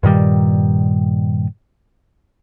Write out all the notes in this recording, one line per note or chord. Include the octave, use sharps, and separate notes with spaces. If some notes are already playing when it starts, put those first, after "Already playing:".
G2 A#2 D#3 G3